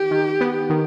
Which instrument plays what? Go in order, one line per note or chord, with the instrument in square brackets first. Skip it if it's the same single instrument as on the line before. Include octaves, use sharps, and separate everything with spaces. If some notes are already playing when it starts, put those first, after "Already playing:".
Already playing: [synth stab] D#3 [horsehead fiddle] G4
[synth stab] D#3
B3
D#3